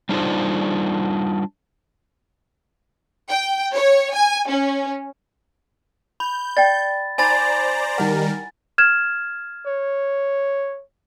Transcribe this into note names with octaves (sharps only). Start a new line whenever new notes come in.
G3 D4 D#4 F4 C5
G5
C#5
G#5
C#4
B5 G6
D5 G5 A6
D#4 C5 D5 G#5 A#5 B5 A6
D#3 G3 E4 A#4 F#5
F6 G#6 E7
C#5